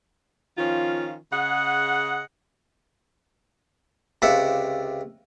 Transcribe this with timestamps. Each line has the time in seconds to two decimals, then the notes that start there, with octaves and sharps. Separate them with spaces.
0.58 D#3 F3 C#4 F4
1.32 C#3 G#4 D#5 F#5
4.22 C#2 C3 F4 A#4 E5 F#5